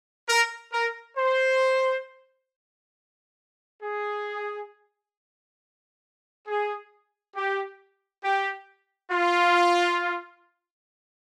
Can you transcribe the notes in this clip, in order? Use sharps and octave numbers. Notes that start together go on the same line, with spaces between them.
A#4
A#4
C5
G#4
G#4
G4
G4
F4